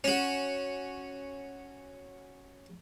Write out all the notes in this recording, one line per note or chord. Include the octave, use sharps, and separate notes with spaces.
C#4 F#4